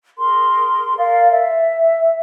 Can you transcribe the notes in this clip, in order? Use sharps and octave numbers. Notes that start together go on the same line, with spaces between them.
G#4 A#4 C6
A#4 D5 F5
E5